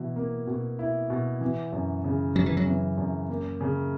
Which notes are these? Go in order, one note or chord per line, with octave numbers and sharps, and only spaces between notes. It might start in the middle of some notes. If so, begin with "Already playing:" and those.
Already playing: B2 E3 E4
A#3
B2
E4
B2
E3
F#2
C#3
F#2 F#3
E3
F#3
E3
F#2
A#3
C#3